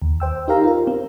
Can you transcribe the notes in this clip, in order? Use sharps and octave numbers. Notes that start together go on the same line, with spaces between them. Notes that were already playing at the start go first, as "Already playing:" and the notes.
D#2
C5 G5 E6
D#4 G4 A#4 F5 A#5
F4 A#4
C4